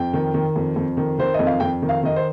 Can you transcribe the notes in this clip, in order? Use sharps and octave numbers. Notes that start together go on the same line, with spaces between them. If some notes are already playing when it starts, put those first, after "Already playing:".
Already playing: F2 G5
D#3
D#3
F2
F2
D#3
D#3 C5
F2 D#5
F5
F2 G5
D#3
F5
D#3 D#5
C5